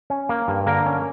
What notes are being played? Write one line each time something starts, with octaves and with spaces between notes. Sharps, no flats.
C#4
A#3
G2
D3 A#3 A#4
C#4